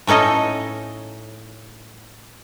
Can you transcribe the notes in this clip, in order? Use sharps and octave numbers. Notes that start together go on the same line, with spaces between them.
A2 C#4 D#4 A4 D#5